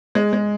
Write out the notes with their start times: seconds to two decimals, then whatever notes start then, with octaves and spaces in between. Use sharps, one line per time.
0.15 G#3
0.33 G#3